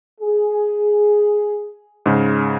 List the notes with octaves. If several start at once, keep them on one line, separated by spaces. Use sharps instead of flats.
G#4
G#2 C#3